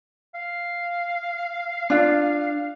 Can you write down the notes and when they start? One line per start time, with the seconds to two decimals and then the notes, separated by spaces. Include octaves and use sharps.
0.35 F5
1.90 D4 F4